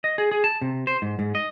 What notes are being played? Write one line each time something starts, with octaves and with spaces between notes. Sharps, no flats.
D#5
G#4
G#4
A5
C3
C5
G#2
G#2
D#5